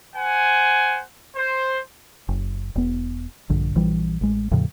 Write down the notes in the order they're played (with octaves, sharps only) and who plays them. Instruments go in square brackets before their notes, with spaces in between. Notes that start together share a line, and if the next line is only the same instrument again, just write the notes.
[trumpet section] C5 F#5 G#5
C5
[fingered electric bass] F#1
E1 B3
A#1 G2 D3
A#1 E3 G3
A1 G#3
E2 A2 C#3 F3